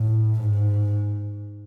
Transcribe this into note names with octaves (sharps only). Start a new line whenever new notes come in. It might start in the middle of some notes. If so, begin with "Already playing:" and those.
Already playing: A2
G#2